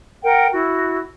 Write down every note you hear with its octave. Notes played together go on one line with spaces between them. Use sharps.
A#4 F#5 G5
E4 F#4